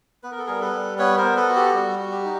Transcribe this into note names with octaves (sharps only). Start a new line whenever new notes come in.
B3 B4
A#4
A4
G3 G#4 A#4
A4 B4
G3
B3 B4 C#5
A#4 C5
B3
A4 B4
F#4
G4 A4
G3
F#4
G4
D#4